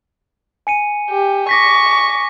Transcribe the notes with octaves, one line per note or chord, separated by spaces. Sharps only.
G#5 C#7 D#7
G4
C#6 D6 A#6 B6